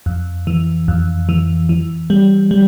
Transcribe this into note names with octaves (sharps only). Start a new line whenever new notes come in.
F2
E3
F2
E3
E3
G3
G3